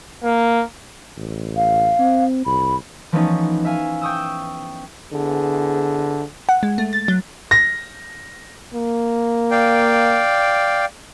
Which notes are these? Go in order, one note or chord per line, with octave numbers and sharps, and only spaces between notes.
A#3
A1
F5
C4
C2 B5
E3 F3 A3 B3 C#4 D#4
E5 F5 G#5
G5 C#6 D#6 E6
D3 B3 E4 G#4
F#5
G#3
A3
A6
F#3
A#6
A#3
D5 F5 G5